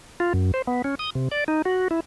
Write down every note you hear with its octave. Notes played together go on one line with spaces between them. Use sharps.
F4
F#2
C5
B3
C#4
D#6
C3
D5
D#4
F#4
E4